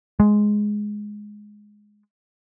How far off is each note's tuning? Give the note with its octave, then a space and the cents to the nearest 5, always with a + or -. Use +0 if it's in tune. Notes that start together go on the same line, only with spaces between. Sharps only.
G#3 +5